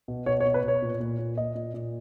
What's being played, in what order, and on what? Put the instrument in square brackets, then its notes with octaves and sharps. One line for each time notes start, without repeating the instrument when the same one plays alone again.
[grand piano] B2
B2 C#5
C#5
B2
B4
B2 C#5
A#2
A#2
A#2
A#2 D#5
A#2
A#2